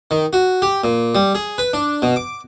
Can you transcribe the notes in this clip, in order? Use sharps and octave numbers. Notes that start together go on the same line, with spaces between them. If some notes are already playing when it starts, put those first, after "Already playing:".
D#3
F#4
G4
A#2
G3
G#4
B4
D4
B2
D6